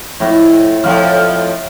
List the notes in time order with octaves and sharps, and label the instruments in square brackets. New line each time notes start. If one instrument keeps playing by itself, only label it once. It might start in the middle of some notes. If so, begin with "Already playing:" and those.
[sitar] F2 [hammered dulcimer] A2
[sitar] F2 A2 F3 [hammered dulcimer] F5 F#5